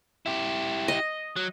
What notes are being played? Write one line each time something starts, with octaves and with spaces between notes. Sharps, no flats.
E4 G4
D#5
F#3